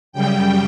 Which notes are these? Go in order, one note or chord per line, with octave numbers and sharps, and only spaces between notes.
F#2 C#3 G3 G5